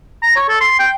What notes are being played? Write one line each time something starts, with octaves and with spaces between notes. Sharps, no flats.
A#5
C#5
A4
C6
G5